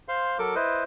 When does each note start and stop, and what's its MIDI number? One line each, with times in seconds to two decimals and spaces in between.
0.08 0.38 72
0.08 0.38 77
0.08 0.38 84
0.39 0.55 54
0.39 0.55 69
0.39 0.55 70
0.39 0.55 86
0.55 0.84 64
0.55 0.84 71
0.55 0.84 72
0.55 0.84 75